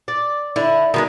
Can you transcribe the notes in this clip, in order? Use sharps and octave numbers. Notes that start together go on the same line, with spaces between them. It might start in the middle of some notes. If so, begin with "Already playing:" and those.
D5
D3 E4
B2 D#3 G3 G#3